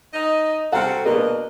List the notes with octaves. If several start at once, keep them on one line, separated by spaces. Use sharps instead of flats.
D#4 D#5
C4 F#4 A4 F#5 A#5 F6
B2 A#3 D4 A#4 B4 D#5